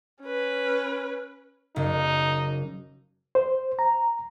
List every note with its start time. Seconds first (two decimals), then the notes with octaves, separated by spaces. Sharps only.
0.22 C#4 B4
1.76 F#1 D#4
3.35 C5
3.79 A#5